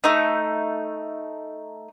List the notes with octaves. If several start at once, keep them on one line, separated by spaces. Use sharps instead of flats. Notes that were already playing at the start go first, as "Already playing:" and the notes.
A3 D#4